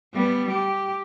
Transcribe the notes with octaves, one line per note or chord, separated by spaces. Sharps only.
G3 B3
G4